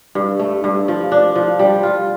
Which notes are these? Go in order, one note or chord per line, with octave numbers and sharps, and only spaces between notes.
G2
A3
G2
F3
D4
F3
G3
F4